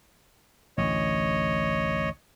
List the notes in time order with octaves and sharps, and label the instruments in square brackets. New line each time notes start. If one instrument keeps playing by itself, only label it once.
[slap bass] A1 D2 [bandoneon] C#5 D#5